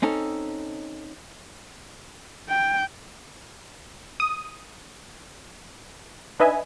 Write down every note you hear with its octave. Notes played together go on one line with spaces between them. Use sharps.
C4 C#4 D#4 A4
G5
D#6
D4 D#4 B4 D#5 E5 G#5